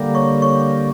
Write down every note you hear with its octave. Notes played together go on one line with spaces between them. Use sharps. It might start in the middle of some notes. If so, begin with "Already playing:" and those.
Already playing: D3 G3 A#3
C#5 C#6
C#5 C#6